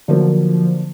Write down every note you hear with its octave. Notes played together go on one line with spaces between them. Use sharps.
D3 F3 F#3 A#3